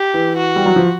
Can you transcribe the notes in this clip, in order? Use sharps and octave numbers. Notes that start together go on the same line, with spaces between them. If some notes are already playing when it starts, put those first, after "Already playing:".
Already playing: G4
E3
F#4
G3
F#3
F3